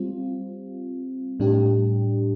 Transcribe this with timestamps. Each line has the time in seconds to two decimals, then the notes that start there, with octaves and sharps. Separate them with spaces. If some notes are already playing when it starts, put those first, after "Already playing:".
Already playing: G3 C4 F4
1.40 A2 G3 D4 G4